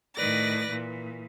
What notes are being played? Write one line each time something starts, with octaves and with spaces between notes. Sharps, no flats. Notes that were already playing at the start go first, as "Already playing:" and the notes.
A2 D#3 B4 D5 A#6
A#2 E3